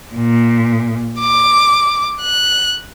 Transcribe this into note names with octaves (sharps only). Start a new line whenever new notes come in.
A#2
D6
F#6